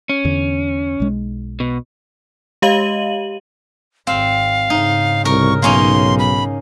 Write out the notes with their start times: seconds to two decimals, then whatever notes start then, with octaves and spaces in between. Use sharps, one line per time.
0.09 C#4
0.25 E2 D3
1.00 B1 G#3
1.60 B2
2.62 G#3 G4 D#5 F5 D#7 F#7
4.07 G#1 C4 F5
4.70 G#2 C#3 D#4
5.25 C2 A#4 C#6
5.62 B1 A#3 C#4 D#4 C6
6.19 B5